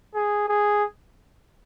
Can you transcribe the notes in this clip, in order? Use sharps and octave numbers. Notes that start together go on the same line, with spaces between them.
G#4
G#4